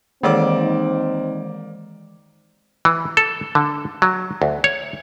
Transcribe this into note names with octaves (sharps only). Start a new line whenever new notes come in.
D#3 E3 G#3 A#3 C4 D#4 D5 D6
E3
A4
D3
F#3
D2
C#5